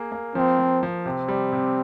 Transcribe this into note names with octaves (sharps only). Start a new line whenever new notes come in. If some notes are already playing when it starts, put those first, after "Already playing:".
Already playing: A#3 G#4
A#3
F3 C4
F3
F3
C3 C4
G3
C3